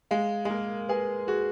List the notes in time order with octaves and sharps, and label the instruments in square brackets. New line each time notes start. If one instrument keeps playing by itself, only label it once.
[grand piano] G#3 [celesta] F5
[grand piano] G#3
[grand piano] A#3 [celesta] A#4
[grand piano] G#4 [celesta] B4
[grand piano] F#4 [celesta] G#4